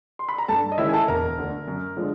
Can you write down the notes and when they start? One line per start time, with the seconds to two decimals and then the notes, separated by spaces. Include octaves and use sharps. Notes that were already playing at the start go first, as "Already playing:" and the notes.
0.19 C6
0.29 B5
0.38 A#5
0.48 G2 A4 A5
0.72 D#5
0.78 D#3 G#3 C#4 E4 E5
0.89 G#5
0.93 A4 A5
1.08 E1 A#4 A#5
1.38 D2 D3
1.68 F#2
1.97 D3 F3 G#3